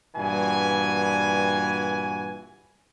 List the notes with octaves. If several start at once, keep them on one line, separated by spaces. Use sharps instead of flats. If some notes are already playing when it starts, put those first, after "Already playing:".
G2 A#2 E3 F#4 G#5